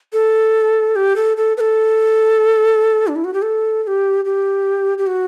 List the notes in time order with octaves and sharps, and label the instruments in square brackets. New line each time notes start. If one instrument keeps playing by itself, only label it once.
[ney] A4
G4
A4
A4
B4
A4
D4
E4
F#4
G4
A4
A4
G4
G4
G4
F#4